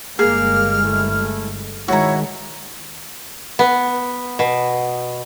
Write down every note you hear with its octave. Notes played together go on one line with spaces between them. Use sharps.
G1 G#3 A#3 G#4 F6
A3 E4
D#3 G#3 E4 F#4 C#5 A#5
B3
B2